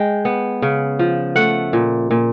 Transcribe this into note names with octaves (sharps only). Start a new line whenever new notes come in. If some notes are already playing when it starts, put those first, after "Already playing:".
Already playing: G#3 G5
B3
C#3
F3
A3 F#5
A#2
A#2